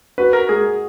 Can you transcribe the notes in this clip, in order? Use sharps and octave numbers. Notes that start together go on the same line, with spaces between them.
F#4 B4
A#4
G#3 G#4